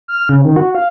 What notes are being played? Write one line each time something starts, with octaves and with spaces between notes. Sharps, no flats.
F6
C#3
D#3
F#4
F5